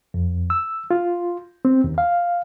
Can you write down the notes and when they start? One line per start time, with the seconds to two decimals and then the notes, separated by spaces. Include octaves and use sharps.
0.14 F2
0.50 E6
0.91 F4
1.65 C4
1.84 D#2
1.98 F5